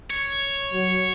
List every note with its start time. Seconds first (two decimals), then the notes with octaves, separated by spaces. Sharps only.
0.10 C#5
0.73 F#3